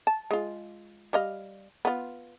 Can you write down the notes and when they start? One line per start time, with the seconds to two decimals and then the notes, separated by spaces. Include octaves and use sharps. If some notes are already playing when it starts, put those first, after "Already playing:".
0.07 A5
0.31 G#3 F4
1.13 G3 D#5 F5
1.85 B3 F4